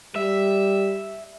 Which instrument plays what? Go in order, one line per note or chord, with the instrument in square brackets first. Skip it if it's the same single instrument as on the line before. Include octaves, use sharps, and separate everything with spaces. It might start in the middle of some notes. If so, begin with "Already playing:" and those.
[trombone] G3 [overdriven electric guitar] E5